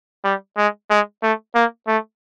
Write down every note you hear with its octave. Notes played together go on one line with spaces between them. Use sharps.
G3
G#3
G#3
A3
A#3
A3